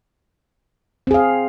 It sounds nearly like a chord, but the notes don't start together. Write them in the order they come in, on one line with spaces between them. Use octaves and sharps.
C4 G#4 F5